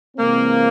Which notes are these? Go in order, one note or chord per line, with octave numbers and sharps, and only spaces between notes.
C3 E3 G#3 A#3 C4